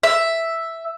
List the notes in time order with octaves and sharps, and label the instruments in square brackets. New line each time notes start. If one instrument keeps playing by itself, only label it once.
[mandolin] E5